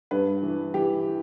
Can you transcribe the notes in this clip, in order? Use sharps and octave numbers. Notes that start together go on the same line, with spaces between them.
G2 B4
E3
E3 G4